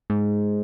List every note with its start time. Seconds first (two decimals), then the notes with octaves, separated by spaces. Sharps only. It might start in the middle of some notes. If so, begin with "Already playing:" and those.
0.10 G#2